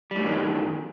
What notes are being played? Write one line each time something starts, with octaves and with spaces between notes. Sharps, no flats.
F#2 A2 D#3 G3